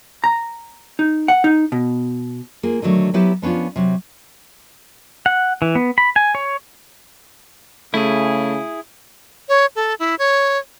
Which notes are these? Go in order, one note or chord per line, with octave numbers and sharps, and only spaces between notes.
A#5
D#4
F#5
D#4
B2
A#3 F4 G#4
D3 D#3 F#3 A3
F#3 B3 E4 G4 B4 C5
F3 B3 C#4 D4 F4
C3 F#3
F#5
E3
B3
B5
G#5
C#5
C#3 A3 E4 G#4
C#5
A4
E4
C#5